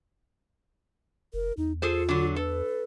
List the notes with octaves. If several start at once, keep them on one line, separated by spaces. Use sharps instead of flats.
F1 A#4
E2 D#4
F4 G#4 A4 C5
D3 F#3
A4 B4